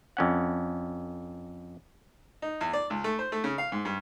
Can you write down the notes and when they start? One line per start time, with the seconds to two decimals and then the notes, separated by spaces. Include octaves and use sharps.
0.17 F2 C#4 F#5
2.42 D#4
2.61 E2
2.73 D5
2.90 C#2
3.04 A3
3.19 C5
3.32 A3
3.44 C#3
3.58 F5
3.72 G#2
3.85 G2